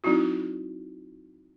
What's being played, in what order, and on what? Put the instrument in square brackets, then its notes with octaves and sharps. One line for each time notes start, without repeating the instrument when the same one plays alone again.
[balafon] F#3 C4 D#4 E4 F#4